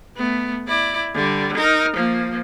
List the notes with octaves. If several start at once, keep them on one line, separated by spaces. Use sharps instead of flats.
A3 B3
E4 D5
D3 G3
D#4 A#4
F3 A#3